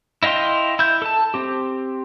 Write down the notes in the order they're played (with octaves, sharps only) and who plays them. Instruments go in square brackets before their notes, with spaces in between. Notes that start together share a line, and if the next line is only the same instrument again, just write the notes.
[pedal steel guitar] E4 D#5 F5 G5 C6
E4 G6
A4 A5
C4 G4